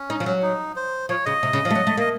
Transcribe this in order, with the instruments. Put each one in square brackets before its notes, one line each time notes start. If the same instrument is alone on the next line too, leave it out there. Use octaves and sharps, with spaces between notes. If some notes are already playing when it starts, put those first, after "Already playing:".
Already playing: [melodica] C#4
[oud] D#4
F3
F#3
[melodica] D#4
C5
[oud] F3 [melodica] C#5
[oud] C#3 [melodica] D#5
[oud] C3
C#3
F3
A3
F#3
A3
[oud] A#3 [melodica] D#5